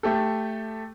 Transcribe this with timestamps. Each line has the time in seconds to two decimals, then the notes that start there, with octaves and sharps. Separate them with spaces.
0.03 A3 G4 A4